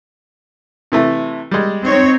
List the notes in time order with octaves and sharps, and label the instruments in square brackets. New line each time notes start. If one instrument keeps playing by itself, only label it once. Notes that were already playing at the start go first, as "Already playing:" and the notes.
[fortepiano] C3 E3 A3
G3 G#3
[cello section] C4 D#4 C#5